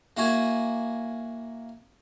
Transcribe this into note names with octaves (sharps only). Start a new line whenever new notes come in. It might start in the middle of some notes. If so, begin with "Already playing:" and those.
A#3 E4 F#4 G#5